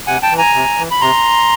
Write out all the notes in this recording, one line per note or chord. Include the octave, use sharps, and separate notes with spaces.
C3 F#5 G#5
G5 A5
E3
G#5 A#5
C3
E3
B5
C3 A#5 C6